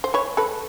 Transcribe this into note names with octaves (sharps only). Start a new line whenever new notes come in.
C5
B4 C#5
A4 B4